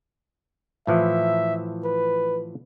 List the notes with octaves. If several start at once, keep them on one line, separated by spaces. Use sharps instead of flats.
A2 E3 F3 E5
B4